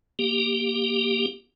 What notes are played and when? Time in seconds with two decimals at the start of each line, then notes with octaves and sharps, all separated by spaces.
0.19 A#3 G4